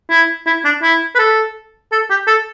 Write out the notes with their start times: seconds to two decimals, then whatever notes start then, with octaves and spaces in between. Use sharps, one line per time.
0.10 E4
0.46 E4
0.65 D4
0.83 E4
1.15 B4
1.19 A4
1.92 A4
2.10 G4
2.27 A4